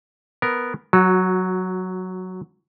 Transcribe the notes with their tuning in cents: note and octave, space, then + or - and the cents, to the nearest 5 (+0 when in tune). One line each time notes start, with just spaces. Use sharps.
B3 +0 A#4 +0
F#3 +0 F#4 -20